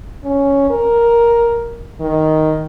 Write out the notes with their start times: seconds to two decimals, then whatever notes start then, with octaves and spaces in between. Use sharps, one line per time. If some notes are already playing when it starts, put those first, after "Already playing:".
0.24 C#4
0.70 A#4
2.00 D#3